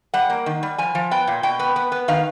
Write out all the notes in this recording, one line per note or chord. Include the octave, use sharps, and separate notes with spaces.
G3 F#5
A#3
D#3
G3
F3 G#5
F3
B3 G5
A#2
B2 G5
B3
B3
B3
D#3 F5